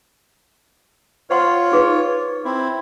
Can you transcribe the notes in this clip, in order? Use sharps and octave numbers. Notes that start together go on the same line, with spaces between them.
F4 C5 C#5 F#5 C6
D#4 G#4 B4
C4 E4